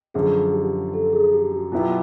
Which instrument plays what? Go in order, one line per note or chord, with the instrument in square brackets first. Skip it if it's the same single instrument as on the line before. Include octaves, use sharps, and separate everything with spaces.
[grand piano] F#2 D3 F3 [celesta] G#4
[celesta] G4
A4
G#4
G4
F#4
[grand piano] B2 F#3 B3 E4 G4 [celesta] F4